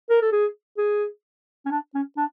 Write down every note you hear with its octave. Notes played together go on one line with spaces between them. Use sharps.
A#4
A4
G#4
G#4
C#4
D4
C#4
D4